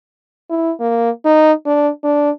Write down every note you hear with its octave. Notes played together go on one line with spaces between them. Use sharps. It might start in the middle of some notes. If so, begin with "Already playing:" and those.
E4
A#3
D#4
D4
D4